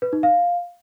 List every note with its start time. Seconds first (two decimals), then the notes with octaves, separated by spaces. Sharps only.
0.02 B4
0.13 D#4
0.23 F5